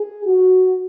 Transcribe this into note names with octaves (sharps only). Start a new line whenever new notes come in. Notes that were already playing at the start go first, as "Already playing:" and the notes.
Already playing: G#4
F#4